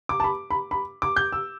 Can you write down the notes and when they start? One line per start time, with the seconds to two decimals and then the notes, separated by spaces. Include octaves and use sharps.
0.09 D6
0.20 A5
0.24 B5
0.51 B5
0.71 B5
1.02 D6
1.16 G6
1.32 E6